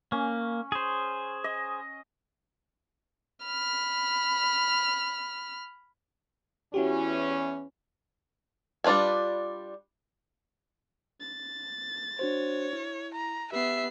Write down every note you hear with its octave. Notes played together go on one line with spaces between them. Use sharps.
A#3 C#4
G#4 C5
D#5
B5 F6
E2 E3 C#4 E4 F#4 G4
G3 D4 F4 B4 G#5
A6
D4 F#4 C5 C#5
E4
A#5
B3 G4 E5 C7